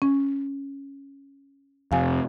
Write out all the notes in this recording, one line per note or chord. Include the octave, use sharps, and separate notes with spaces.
C#4
F2 C3 F5 G#5